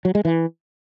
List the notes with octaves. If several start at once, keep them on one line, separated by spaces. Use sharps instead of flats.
F#3
G#3
E3